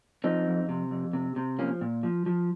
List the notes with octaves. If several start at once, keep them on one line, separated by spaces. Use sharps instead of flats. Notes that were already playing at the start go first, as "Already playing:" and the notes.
F3 C4 D#4
F2
C3
F2
C3
C3
F3 A#3 C#4
A#2
F3
F3